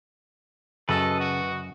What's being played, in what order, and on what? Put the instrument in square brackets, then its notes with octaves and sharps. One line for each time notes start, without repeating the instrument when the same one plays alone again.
[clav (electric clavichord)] F#2 [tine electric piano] C#3 [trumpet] A4 [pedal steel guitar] B4 D#5
[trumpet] F#4